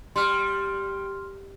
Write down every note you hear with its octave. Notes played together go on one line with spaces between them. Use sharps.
G3 C6 F6